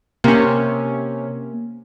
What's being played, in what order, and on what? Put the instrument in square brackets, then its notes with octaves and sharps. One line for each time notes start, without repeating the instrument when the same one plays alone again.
[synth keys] C3 C#4 [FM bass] A#3